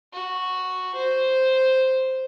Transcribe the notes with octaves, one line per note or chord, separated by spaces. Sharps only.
F#4
C5